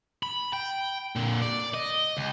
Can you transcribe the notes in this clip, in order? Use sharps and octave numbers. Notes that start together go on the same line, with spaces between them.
B5
G5
A#2 D3
D5
D#5
C#2